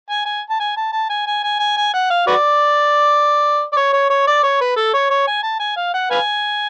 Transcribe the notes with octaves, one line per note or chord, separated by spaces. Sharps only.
G#5
G#5
A5
G#5
A5
A5
G#5
G#5
G#5
G#5
G#5
F#5
F5
F#4 B4 D5
D5
C#5
C#5
C#5
D5
C#5
B4
A4
C#5
C#5
G#5
A5
G#5
F5
F#5
B4 F5 G#5